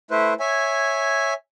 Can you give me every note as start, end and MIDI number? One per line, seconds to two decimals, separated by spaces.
0.11 0.34 57
0.11 0.34 64
0.11 0.34 71
0.11 0.34 72
0.40 1.34 73
0.40 1.34 76
0.40 1.34 80